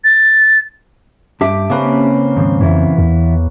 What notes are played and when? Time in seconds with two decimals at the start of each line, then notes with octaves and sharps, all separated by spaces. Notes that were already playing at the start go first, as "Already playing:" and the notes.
0.04 A6
1.41 G2 D4 G4 E5 D6
1.70 C#3 A#3 C4 C#4 B4
2.37 D#2 G#2 F3
2.61 F2 E3 B3 E4
2.98 E2